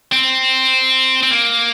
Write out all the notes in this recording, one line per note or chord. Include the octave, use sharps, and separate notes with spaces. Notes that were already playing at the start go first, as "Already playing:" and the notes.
C4
C4
A#3